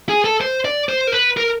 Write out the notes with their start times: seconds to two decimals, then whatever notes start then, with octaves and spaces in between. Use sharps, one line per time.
0.09 G#4
0.24 A4
0.41 C5
0.65 D5
0.89 C5
1.07 A#4
1.12 B4
1.37 A#4